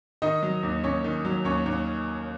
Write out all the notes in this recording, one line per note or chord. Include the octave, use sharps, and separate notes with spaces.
D#3 D#4 D#5
F#3
D#2
D#2 C#4 C#5
D#3
F#3
D#2 C#4 C#5
D#2